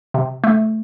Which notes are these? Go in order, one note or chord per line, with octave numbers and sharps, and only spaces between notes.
C3
A3